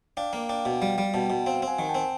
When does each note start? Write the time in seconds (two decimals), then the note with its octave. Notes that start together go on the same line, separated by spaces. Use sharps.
0.17 D4 F5 G5
0.33 A#3
0.49 D4 F5 G5
0.65 B2
0.82 G3 F5 G5
0.98 G3
1.14 B2 G5 A5
1.30 B2
1.46 C4 F5 G5
1.62 C4
1.67 F#5 G#5
1.79 D#3
1.89 G5 A5
1.95 C4